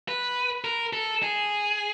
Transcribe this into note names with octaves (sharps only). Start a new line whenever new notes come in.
B4
A#4
A4
G#4